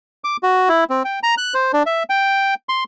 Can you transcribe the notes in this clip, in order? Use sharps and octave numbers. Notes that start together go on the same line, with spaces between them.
D6
F#4
E4
C4
G5
A#5
F#6
C5
D4
E5
G5
C6